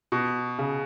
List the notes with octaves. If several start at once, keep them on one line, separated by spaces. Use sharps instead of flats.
B2
C#3